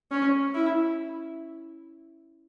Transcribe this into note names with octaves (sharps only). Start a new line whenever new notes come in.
C#4
E4